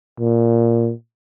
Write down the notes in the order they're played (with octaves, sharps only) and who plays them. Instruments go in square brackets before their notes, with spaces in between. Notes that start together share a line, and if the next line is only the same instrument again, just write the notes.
[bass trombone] A#2